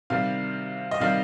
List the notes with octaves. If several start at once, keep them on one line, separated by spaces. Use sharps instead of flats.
C3 D#3 G3 F5
D#5
C3 D#3 G3 F5